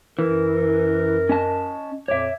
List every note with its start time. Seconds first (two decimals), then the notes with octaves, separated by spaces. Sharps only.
0.19 F#2 E3 A#4
1.29 C#4 D#5 A5
2.08 F2 A#2 C#5 E5 D6